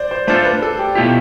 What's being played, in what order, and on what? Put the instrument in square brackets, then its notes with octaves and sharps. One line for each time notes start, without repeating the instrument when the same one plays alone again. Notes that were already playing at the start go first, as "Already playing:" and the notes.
Already playing: [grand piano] C5 D5
C5
[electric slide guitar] A3 D4 F4 A4 [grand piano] C5
[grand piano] B4
A4
G4
[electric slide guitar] B2 A3 E4 G4 [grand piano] F4